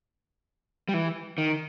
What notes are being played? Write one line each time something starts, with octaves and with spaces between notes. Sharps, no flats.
G3
E3
D#3